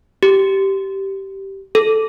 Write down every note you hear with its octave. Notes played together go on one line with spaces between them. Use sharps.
G4
A4